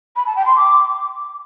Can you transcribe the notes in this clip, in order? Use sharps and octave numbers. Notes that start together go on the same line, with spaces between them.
B5
A5
G5
C6
D6